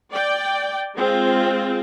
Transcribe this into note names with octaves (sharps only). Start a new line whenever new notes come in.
D5 G5
G#3 C4 F4